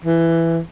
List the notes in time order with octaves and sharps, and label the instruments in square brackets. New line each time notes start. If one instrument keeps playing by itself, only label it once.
[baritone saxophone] E3